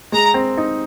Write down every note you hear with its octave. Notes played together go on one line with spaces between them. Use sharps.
G#3 A#5
C4
D#4